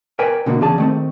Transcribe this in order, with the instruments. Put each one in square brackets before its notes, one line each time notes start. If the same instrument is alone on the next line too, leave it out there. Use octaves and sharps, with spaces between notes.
[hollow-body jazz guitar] A#4 B4 D5 G5 G#5
B2 D3 A#3 F#4
E2 C#3 G#4 D5 A5
D#3 A3 C4